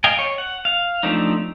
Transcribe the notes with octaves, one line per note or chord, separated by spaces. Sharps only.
D#5 F5 G5 G#5
C#5
F#5
F5
F3 A3 C4 D4 D#4